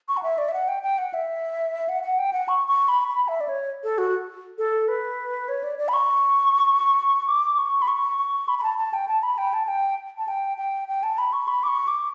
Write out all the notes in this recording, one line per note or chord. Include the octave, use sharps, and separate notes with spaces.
C#6
F#5
E5
D5
E5
F#5
G5
G5
F#5
E5
F#5
F#5
G5
F#5
C#6
C#6
B5
B5
E5
D5
C#5
A4
F#4
A4
B4
C#5
D5
D5
B5
C#6
D6
C#6
B5
C#6
C#6
B5
B5
A5
A5
G5
A5
B5
G5
A5
G5
A5
G5
G5
G5
A5
B5
C#6
B5
D6
C#6
D6